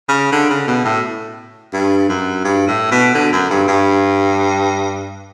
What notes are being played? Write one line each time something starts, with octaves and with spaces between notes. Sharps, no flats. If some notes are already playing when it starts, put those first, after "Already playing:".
C#3
D3
C#3
B2
A2
G2
F#2
G2
A2
B2
D3
F#2
G2
G2